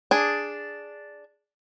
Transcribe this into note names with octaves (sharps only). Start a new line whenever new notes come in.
D4 G#4